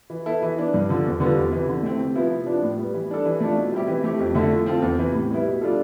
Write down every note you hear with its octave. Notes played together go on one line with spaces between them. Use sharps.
E3
B3 E4 A4
E3
B3 D4
G2
D3 F3
E2
D3 G3 B3 F4
E2
C3 E3
D3
A3 C4
C3
F3 B3 E4
C3
F3 B3 D4
A2
G3 B3
E3
G3 D4 A4
E3
A3 D4 F4 A4
B2
G3 C4 E4 G4
E3
A3 C4 G4
F2
D3 A3 E4 A4
F3
C4 F4 A4
E2
C3 E3
A2
G3 B3 E4
B2
G3 D4 F4 A4